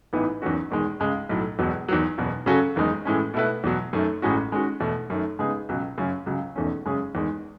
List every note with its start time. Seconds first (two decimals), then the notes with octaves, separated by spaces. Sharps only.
0.13 A1 G#2 E3 B3 D#4
0.42 E2 D#3 F#3 C#4 F#4
0.70 E1 E2 D#3 G#3
1.00 C#2 C#3 G#3
1.29 B1 A2 F#3
1.59 E1 E2 B2 F#3
1.89 E2 D#3 F#3
2.18 F#1 E2 B2
2.46 C#3 F#3 C#4 F#4 A4
2.76 F#1 E2 D#3 G#3 D#4
3.05 A2 E3 G#3 C#4
3.34 B2 A3 E4 B4
3.64 E2 B2 F#3
3.93 F#2 D#3 A3
4.22 A1 A2 G#3 C#4 F#4
4.52 D#3 G#3 C#4 F#4
4.80 E2 B2 A3
5.10 F#2 D#3 A3
5.39 C#3 G#3 B3 D#4 G#4
5.69 C#2 B2 F#3 C#4
5.98 F#2 C#3 F#3 C#4
6.26 C#2 C#3 F#3
6.56 E1 E2 D#3 A3 C#4
6.85 F#2 C#3 G#3 C#4 G#4
7.15 E2 D#3 G#3